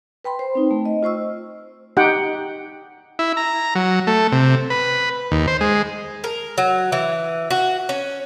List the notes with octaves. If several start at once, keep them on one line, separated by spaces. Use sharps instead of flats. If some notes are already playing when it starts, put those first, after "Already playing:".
B4 G5 B5 C6
C5
C4 D#4
A3
D#5
F4 C5 C#6 E6
D#4 G4 F#5 G5
E4
A#5
F#3
A3
C3
B4
D#2
C5
G#3
A#4
F#3
E3
F#4
C#4